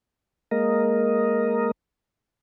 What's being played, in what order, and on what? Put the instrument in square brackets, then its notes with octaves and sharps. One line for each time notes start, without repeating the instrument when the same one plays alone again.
[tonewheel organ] G#3 A#3 A#4 D#5